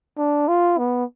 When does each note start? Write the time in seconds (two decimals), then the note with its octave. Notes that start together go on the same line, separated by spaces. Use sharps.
0.18 D4
0.48 F4
0.78 B3